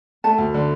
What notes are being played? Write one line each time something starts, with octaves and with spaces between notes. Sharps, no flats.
A3 A5
D2
D3